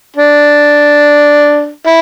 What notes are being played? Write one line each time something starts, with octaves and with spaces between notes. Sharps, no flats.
D4
E4